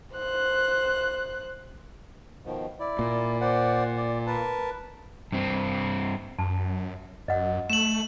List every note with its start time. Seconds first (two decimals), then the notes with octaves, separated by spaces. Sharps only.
0.14 C5 F#6
2.45 B2 D#3 F3
2.80 E4 D5
2.99 A#2
3.41 C5 D5 F#5
3.97 D5
4.27 A#4 B4 A5
5.32 G2 C4
6.39 F#2 A5
7.28 F#2 D#5 F#5
7.70 A3 E7 F#7